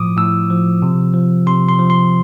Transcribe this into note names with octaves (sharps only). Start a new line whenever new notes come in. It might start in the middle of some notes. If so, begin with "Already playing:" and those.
Already playing: A2 F3 D6 D#6
A2 E6
F3
C3
F3
C3 C6
C6
F3
C6